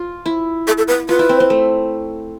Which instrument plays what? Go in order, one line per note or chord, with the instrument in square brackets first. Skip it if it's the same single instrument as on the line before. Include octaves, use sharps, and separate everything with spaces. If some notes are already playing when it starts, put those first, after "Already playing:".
Already playing: [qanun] F4
E4
[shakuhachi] A4
A4
B4
[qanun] F4 [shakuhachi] B4
[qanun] E4
C4
C4
A3